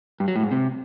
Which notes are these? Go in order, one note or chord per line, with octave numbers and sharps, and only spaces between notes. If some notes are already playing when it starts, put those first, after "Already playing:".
G2
F#3
A2
G#2
C3